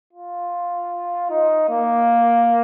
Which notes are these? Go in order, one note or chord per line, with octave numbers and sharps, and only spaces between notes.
F4
D#4
A#3